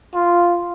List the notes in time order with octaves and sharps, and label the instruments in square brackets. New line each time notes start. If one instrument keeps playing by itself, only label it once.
[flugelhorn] F4